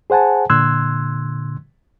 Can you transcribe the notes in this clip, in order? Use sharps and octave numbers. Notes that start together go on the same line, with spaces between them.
G#4 C5 F#5 G#5 A5
A#2 D3 C6 E6 F#6 G#6